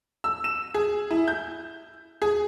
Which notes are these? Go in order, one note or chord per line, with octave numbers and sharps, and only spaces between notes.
E6
E7
G#4
E4
G6
G#4